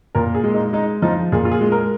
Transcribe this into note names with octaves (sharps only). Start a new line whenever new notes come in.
A#2 A#4
G#4
G#3
D#4
G#3 D#4
F3 D#4
A#2 G#4
F4
G#4
G#3
A#4